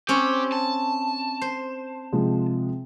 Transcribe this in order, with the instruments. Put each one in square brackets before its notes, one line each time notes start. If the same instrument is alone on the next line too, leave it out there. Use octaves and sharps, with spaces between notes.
[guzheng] C4 C#4 C#5 [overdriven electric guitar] G4
[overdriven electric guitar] A5
[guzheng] C5
[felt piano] C3 F3 G#3